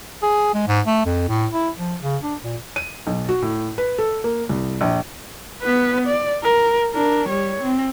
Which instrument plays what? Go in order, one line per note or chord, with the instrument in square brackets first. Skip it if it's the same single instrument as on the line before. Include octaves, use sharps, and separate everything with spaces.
[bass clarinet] G#4
G#3
G#2
A3
F2
A2
E4
F3
C#3
D4
A#2
[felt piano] D#7
B1
F#4
A2
B4
A4
A#3
C2
A#1
[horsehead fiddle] B3 B4
D5
A#4
D4 A#4
G3 C#5
C4